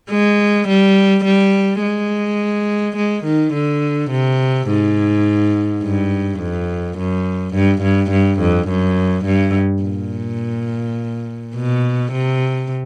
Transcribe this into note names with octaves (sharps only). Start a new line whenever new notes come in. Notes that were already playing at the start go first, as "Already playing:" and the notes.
G#3
G3
G3
G#3
G#3
D#3
D3
C3
G#2
G2
F2
F#2
G2
G2
G2
F2
F#2
G2
A#2
B2
C3